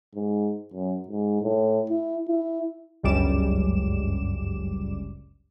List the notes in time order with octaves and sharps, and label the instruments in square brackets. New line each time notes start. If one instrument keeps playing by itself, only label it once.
[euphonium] G#2
F#2
G#2
A2
E4
E4
[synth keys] G1 C#2 F#2 G3 D6 E7